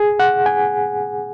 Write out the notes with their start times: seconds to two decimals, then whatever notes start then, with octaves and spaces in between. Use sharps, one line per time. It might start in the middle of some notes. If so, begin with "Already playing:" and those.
Already playing: G#4
0.20 F#5
0.46 G#5